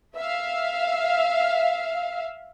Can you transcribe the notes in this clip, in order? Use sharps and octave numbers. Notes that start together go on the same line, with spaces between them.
E5 F5